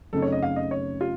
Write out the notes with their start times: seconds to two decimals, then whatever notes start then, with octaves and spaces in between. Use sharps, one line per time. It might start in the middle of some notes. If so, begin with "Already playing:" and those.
0.13 F#2 C#3 A3 C4 D#4 A4
0.22 C#5
0.32 D#5
0.42 F5
0.56 D#5
0.71 C#5
1.01 F4